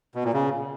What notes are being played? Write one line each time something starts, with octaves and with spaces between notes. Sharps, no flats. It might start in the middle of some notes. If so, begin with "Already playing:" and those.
B2
A#2
C#3